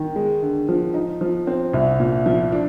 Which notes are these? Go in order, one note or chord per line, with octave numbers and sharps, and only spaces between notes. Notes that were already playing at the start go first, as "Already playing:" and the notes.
Already playing: D#3
G#3
D3
F3
D#4
F3
C4
C2
A#2
F3
D4